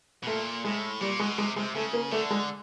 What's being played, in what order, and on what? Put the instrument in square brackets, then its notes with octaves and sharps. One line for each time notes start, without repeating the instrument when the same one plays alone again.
[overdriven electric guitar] B2
[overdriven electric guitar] A#2 [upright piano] A3
[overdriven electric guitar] A2 [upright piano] G#3
[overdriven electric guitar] A#2 [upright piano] G3
[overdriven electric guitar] B2 [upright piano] G#3
[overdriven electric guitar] C3 [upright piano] G#3
[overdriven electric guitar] C3 [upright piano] G#3
[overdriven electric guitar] C#3 [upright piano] A3
[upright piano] A#3
[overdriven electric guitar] D3 [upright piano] A3
[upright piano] G#3